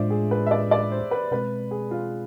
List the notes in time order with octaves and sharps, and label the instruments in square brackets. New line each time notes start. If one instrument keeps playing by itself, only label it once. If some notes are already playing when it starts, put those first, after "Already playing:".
Already playing: [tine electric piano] A2 G#3 D4 F4 [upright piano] C5 D5 E5
[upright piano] G#4
B4
E5
D5
D5
C5
B4
[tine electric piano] B2 G#3 C4 [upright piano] B4
[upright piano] G#4
F4